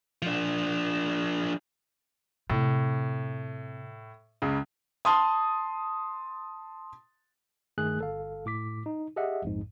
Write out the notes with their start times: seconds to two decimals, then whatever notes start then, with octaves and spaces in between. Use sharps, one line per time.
0.22 F3 D4
2.50 A2 C3
4.42 C#2 C#3
5.05 A5 C6 D#6
7.78 G2 D#3 A3 G#4 F#6
7.99 G1 A4 F5
8.46 A2 D6 B6
8.86 D#4
9.16 G4 G#4 D#5 E5 F#5
9.42 A#1 F2 G#2